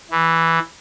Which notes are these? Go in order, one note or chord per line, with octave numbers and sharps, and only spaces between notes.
E3